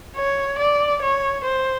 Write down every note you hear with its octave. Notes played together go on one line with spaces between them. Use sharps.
C#5
D5
C#5
C5